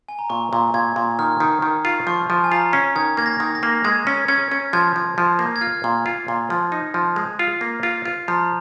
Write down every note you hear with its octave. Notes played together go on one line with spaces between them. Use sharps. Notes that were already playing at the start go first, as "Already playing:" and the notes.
G#5
A#5
A#2 C#6
A#2
A#2 G#6
A#2
D#3 F6
D#3
D#3
F4
F3 C#6
F3
G#5
F4 A#5
C#4
D#3 G#6
A#3 G#6
A#6
D#3
A#6
A#3
G#3 G#6
C#4
C#4 G#6
C#4
F3 G#6
F3
F3
A#3
G#6
F4 F6
A#2
F4
A#2
F3
D#4
F3
G#3
F4
A#3
F4
F4
F3 A#5